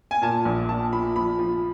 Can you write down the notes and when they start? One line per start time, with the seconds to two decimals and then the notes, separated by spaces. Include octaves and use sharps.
0.11 G#5
0.22 A#2 A5
0.45 A#1
0.69 A#2 A5
0.93 F3 B5
1.16 F3 B5
1.39 F3